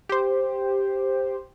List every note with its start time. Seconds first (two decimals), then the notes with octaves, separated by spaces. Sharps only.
0.09 G4 C5